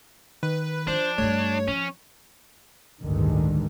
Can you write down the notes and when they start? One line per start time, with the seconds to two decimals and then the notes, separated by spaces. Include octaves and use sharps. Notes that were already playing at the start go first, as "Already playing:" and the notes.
0.43 D#3 B4
0.87 F3 D4 C5
1.18 G2 G3 A3 C#5
1.68 F3 C#4
3.01 A1 D2 G2 D3 D#3 G#3